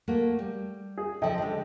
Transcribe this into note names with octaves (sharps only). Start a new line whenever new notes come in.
A3 A#3 F#4
G3
G#4
C#3 F3 A4 D#5 G5
D3 G#3